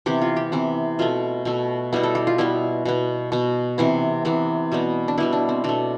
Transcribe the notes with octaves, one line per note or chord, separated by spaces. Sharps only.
C3 E3 B3 G4
F4
G4
C3 E3 B3
B2 A3 F4
B2 A3
B2 G3 B3 E4
A4
G4
F4
B2 G3 B3 E4
B2 B3
B2 B3
C3 E3 B3
C3 E3 B3
B2 G3 B3
D4
B2 G3 B3 E4
D4
C4
B2 A3 D4